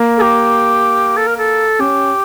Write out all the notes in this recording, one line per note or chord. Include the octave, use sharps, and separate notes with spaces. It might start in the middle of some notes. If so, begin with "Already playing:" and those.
Already playing: A#3
A4
G4
A4
A#4
A4
C#4 G4